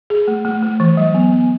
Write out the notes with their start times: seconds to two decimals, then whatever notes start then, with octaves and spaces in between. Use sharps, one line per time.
0.10 G#4
0.28 A3
0.45 A3
0.62 A3
0.80 E3
0.97 F#3
1.15 B3
1.32 B3